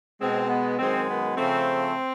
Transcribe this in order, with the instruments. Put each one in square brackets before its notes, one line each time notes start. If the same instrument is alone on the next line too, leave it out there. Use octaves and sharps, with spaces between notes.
[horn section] B2 G#3 C4
B3
F#2 D#3 G#3 C4
B3
C#3 F3 A3 C4